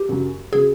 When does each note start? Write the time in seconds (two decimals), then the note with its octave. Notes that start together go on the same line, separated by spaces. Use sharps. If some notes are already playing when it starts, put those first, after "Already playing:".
Already playing: G4
0.09 F#2 C#3 F#3
0.53 C#3 F#3 G#4